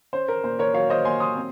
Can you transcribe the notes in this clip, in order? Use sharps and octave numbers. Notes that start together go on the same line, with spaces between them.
C#4 C5
A#4
A#2 C5
A#4 C#5
F#3 C#5 F5
C5 D#5
A#3 G#5 C6
C6 D#6
C4